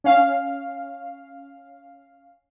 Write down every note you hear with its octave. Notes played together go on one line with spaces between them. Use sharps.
C#4 F5